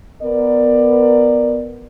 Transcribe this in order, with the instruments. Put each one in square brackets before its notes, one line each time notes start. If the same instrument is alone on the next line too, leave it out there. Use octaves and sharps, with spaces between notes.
[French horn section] B3 A#4 D5